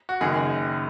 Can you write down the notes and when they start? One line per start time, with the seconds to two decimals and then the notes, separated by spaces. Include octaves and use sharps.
0.09 F#4
0.21 F#1 F#2 D#3 G#4